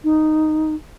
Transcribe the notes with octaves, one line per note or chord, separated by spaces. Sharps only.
D#4